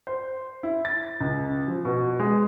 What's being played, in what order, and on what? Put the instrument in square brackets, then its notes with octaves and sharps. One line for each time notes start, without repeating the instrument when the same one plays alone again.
[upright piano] C5
E4
A6
C#2
F3
B2
G#3